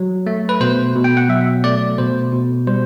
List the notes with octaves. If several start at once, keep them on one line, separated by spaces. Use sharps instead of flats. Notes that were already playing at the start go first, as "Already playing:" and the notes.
Already playing: F#3
A3
B4
B2 C5
B2
G5
F#5
F#3 E5
A3 D5
B2 C5
B2
G3 C5